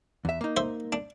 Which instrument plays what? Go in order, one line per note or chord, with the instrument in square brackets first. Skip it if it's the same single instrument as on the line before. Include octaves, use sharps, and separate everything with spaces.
[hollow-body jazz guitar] E2 E5
A#3 D#4
[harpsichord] C5 E5
D4